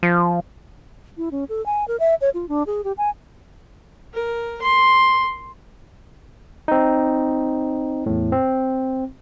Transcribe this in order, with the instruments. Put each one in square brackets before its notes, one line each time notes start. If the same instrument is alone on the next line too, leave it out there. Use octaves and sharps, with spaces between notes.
[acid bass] F3
[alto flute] E4
C#4
A4
G#5
A#4
E5
C#5
F4
D4
G#4
G4
G#5
[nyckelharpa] A#4
C6
[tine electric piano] C4 D#4
E2 A2
C4